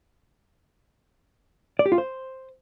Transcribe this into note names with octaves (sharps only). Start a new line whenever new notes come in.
D5
G4
F4
C5